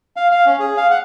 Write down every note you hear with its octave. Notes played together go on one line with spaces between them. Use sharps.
F5
F5
C#4
G#4
F5
F#5